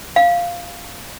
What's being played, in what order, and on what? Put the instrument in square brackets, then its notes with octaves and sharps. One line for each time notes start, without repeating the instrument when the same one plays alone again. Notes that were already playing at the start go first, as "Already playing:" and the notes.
[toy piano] F5